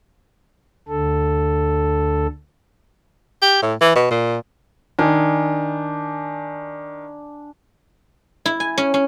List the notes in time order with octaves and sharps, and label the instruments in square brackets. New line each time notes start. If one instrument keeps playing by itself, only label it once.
[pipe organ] D2 D3 A4
[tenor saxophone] G4
A2
E3
B2
A#2
[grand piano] D#3 [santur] D4 G#5
[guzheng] E4
G#5
C#4
C#4